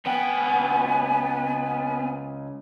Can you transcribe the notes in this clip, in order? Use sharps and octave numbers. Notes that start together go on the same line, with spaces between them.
C#2 B3 G5 G#5